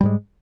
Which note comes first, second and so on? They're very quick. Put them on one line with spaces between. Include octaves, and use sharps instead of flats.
G3 G#2 G#3